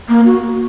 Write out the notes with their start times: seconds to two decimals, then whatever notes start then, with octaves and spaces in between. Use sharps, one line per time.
0.09 A#3
0.26 F#4